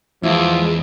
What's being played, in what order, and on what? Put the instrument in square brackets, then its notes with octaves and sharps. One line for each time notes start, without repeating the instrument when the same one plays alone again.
[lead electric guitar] E2 [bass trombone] F3 [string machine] G#3 [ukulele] E4